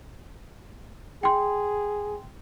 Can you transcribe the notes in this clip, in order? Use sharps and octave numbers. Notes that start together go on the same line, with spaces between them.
G#4 G5 C6